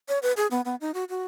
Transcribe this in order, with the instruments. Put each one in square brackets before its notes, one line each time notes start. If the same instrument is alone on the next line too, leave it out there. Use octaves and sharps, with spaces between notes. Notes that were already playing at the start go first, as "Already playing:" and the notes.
[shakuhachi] C#5
B4
G#4
B3
B3
D#4
F#4
F#4